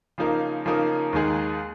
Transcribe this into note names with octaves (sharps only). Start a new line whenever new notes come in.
C#3 F3 A#3 D#4 A#4
C#3 F3 A#3 D#4 A#4
D#2 D#3 G#3 D#4 G#4